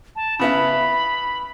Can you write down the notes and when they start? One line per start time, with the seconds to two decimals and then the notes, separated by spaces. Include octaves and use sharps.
0.16 A5
0.39 C#3 B3 E4 B5